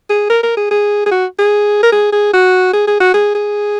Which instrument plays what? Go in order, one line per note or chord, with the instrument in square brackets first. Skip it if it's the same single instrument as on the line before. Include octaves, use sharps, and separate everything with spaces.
[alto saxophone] G#4
A#4
A#4
G#4
G#4
G#4
F#4
G#4
A#4
G#4
G#4
F#4
G#4
G#4
F#4
G#4
G#4